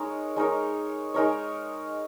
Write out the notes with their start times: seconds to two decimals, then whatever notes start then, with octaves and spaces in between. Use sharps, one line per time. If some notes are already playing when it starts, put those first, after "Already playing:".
Already playing: G#3 D#4 A#4 C#5
0.36 G#3 D#4 A#4 C#5
1.14 G#3 D#4 A#4 C#5